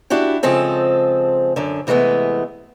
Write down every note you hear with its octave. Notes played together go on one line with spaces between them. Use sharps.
D4 E4 F#4 G4
C#3 F3 G#3 C4 A4
F#2 D3
C3 E3 G#3 A3 B3